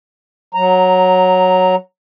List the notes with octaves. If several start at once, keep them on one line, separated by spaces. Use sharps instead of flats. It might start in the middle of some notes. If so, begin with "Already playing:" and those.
F#3 A#5